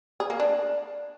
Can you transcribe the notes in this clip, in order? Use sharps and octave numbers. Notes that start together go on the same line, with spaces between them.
G#4
A#3
D4